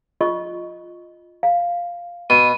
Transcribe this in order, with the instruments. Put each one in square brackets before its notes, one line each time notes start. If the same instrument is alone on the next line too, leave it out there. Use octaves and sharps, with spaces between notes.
[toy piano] F4 D#5 C#6
F5
[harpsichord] B2 [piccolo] D#7